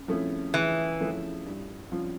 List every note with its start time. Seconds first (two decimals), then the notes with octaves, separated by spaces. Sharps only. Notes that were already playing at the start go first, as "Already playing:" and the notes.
Already playing: C#3
0.08 F3 A3 C#4 E4
0.54 C#3 E3
1.00 F3 A3 C#4 E4
1.46 G2
1.92 F3 C#4 F4